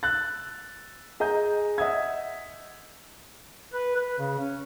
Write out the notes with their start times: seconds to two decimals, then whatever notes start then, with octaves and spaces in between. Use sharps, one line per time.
0.03 E6 F#6 A6
1.20 G#4 D#5 A#5 G6
1.78 D#5 E5 F#5 D#6 E6 G#6
3.73 B4
3.96 B4
4.19 C#3
4.39 C#4